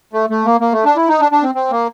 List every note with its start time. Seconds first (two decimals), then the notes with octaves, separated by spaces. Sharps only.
0.13 A3
0.30 A3
0.45 A#3
0.61 A#3
0.72 A3
0.85 D4
0.96 E4
1.08 D#4
1.20 D4
1.32 D4
1.43 C4
1.55 C4
1.71 A#3